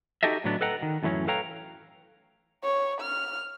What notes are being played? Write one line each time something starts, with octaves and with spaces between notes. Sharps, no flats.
D#4 F#4 G4 A4 D#5 E5
A2 D3 F#3 B3 D4
A4 B4 D#5 F#5 G5 A#5
D#3
F#2 A2 E3 F#3 C#4
A4 B4 C#5 F5 G5 A#5
C#5
F6